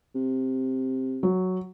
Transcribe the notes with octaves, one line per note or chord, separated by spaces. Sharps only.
C3
F#3